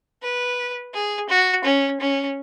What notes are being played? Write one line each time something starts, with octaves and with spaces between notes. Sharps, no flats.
B4
G#4
F#4
C#4
C#4